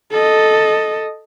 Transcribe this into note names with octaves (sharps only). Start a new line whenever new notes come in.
A4 D#5